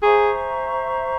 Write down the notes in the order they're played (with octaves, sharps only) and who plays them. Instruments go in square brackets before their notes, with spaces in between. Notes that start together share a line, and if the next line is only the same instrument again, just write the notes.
[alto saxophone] G#4 [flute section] C5 E5 A#5 C#6